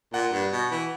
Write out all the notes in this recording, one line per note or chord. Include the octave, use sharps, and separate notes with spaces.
A#2 F#5
G2
B2
E3